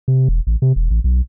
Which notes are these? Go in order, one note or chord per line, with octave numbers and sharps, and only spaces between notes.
C3
E1
A1
C3
E1
A1
B1